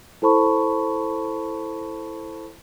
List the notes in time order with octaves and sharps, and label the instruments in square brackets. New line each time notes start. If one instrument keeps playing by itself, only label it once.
[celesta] E4 A4 C5 A5 B5 C#6